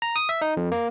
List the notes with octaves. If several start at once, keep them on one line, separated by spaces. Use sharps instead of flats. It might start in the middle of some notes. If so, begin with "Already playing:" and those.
A#5
D#6
E5
D#4
F2
A#3